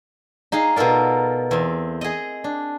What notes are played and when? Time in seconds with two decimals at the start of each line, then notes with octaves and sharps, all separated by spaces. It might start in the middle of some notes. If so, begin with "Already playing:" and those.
0.52 D#4 G#4 F5
0.76 B2 F4 A4 A#4 D5
1.51 E2 C4
2.01 G#4 D#5
2.44 D4